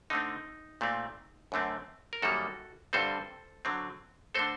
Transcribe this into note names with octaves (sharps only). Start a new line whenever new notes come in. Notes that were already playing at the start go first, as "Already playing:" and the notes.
D3 A3 C4 D#4
A#2 A3 C4
F#2 D3 A3 C4
A#4
F#2 D#3 G3 A#3 F#4 A4
G2 D3 G3 C4 A4 C5
D3 F#3 C4
D3 A3 C4 A4 C5